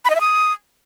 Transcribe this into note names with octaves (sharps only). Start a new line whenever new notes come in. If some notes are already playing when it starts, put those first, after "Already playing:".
B5
D#5
E5
D#6